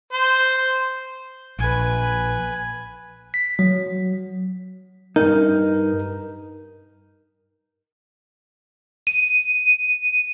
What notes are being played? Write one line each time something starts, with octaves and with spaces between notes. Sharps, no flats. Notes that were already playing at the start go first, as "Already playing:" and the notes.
C5
A#1 B4 G#5
B6
F#3
G2 D#4 A#4
D#7